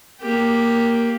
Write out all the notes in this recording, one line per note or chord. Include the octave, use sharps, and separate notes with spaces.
A#3 G4